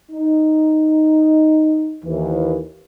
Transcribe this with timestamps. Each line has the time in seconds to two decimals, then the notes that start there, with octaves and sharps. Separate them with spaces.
0.11 D#4
2.05 D#2 E3